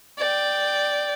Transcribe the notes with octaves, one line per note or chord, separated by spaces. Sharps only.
D5 G5